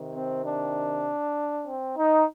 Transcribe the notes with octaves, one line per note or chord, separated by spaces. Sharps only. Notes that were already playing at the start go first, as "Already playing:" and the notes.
Already playing: C3 D#3
C4
D4
C4
D#4